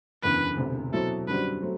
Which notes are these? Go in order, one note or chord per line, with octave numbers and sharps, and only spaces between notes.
F#1 E2 D3 B4
E1 D2 C3
B2 F#3 C4 E4 A4
F#2 D3 G3 C4 F#4 B4
F#3 A3 C4